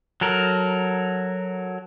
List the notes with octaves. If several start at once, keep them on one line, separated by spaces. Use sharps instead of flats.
F#3 A4 A#4